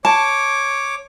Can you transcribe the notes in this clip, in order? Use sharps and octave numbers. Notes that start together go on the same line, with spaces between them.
C#5 A5 D6